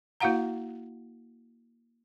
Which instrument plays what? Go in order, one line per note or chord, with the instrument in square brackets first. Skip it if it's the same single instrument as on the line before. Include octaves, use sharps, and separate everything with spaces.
[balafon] A#3 E4 F#4 F5 F#5 A#5